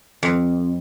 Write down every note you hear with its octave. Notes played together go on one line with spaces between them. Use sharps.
F2